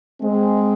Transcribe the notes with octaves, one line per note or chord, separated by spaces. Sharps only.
G#3 C4